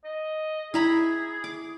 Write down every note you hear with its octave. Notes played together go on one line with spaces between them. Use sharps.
D#5
E4 G#4 A#5 B5
D6